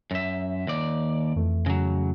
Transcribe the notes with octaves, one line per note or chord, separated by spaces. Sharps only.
F#2 E5
D#2 D5
F2 E3 A3
C#3 F#3